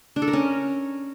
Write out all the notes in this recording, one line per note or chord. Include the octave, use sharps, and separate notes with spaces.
D4
A4
A#4
C#4